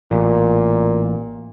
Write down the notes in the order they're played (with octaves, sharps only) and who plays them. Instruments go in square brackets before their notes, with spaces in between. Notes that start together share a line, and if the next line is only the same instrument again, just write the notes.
[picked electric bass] A1 [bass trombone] A#2